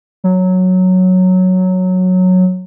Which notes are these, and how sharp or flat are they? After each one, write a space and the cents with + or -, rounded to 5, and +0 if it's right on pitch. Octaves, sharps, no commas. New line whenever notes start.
F#3 -5